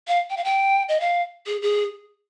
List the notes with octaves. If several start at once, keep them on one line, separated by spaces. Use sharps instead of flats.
F5
G5
F5
G5
D#5
F5
G#4
G#4